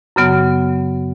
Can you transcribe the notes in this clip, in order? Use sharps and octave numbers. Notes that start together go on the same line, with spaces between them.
F#2 C#3 F#3 B3